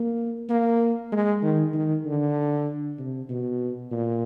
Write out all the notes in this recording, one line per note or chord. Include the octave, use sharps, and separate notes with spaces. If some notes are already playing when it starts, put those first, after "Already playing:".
Already playing: A#3
A#3
G#3
D#3
D#3
D3
C3
B2
A#2